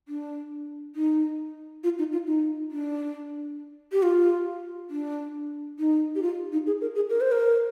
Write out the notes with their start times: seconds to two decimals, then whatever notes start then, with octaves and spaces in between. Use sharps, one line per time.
0.08 D4
0.96 D#4
1.84 F4
1.98 D#4
2.12 F4
2.27 D#4
2.71 D4
3.92 G4
4.03 F4
4.90 D4
5.79 D#4
6.15 G4
6.22 F4
6.52 D#4
6.67 G#4
6.81 A#4
6.95 G#4
7.10 A#4
7.21 C5
7.32 A#4